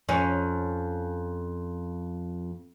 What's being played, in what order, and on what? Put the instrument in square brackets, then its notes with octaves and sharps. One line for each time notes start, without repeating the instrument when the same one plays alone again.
[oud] F2 C#4